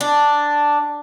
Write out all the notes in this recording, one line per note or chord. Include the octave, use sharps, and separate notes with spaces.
D4